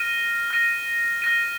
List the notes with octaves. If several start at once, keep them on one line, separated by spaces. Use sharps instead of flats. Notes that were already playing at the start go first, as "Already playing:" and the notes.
Already playing: F6 A#6 D#7
F6 A#6 D#7
F6 A#6 D#7